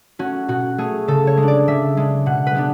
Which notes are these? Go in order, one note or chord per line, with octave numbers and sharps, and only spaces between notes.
A3 C#4 F#4
B2 F#4
A3 C#4 G#4
C#3 A4
C#5
G#3
D4
D5
C#3 E5
G#3 D4
B2 F#5
B4
G#3 B3 D4